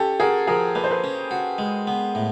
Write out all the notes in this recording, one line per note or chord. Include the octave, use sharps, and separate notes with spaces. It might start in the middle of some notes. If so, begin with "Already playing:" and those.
Already playing: C#4 G4 A4
F#4 G#4 A#4
F3 G#4 A#4
A#3 B4
C5
A4 B4
C#4
F#4
G#3
B3
A2